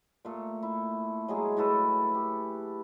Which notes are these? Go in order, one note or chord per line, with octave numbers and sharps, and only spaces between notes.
A#2 A3
E4
F#3 G#3 G#4
A2 F#4 A4 B4
G4